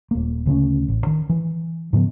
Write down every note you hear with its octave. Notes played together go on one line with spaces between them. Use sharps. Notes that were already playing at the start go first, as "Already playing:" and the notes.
D#1 A#3
D2 C#3 B3 C#4
A1
D#3
E3
G#2 C#3 F3 B3